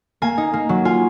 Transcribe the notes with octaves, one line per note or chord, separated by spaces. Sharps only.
A#3 G#5
D#4
A#3
F#3
F4 G#5